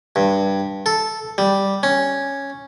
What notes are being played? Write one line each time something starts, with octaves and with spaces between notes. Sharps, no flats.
G2
A4
G3
C#4